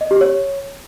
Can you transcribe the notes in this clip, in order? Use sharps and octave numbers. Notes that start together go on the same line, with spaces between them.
D#5
G4
C#5